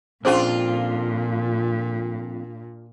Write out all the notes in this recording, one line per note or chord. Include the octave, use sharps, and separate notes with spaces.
F2 A#2 C#4 D4 F4 G#4 C5